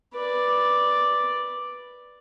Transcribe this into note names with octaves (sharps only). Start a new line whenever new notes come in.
B4 D5